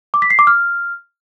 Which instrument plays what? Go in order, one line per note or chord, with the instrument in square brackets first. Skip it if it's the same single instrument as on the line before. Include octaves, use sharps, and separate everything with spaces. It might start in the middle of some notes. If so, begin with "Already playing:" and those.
[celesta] D6
B6
C7
D6
F6